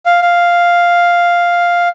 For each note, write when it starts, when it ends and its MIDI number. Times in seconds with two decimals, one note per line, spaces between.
0.06 0.21 77
0.22 1.88 77